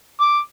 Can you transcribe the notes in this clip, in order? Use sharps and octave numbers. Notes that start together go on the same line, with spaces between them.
D6